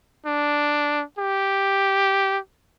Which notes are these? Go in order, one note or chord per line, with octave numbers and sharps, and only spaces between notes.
D4
G4